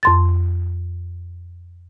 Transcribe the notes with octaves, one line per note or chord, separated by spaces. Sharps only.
F2 C6 A6